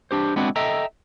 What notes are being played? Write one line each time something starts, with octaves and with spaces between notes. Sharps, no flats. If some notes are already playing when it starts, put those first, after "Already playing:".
D4 G4 C5
G#3 B3 C4 D4 E4 F#4
A4 D#5 E5 G5 A#5